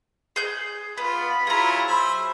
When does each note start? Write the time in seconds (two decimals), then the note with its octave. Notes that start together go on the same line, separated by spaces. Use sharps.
0.36 G#4 G6
0.98 B3 F4 B5
1.47 F#3 E4 F4 G#4 A#5
1.87 C5 E5 B5